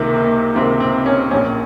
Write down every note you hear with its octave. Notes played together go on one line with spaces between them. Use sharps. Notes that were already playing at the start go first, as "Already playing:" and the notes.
Already playing: C#2 C3 D#3 A#3
A#3
C#2 C3 D#3 C4
C4
C#4
A#1 A#2 C#4